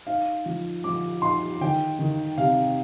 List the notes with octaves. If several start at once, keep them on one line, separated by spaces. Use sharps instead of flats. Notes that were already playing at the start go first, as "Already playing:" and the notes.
D#4 F5
F3
F3 D6
D#4 C6
D#3 G5
D#3
C3 F5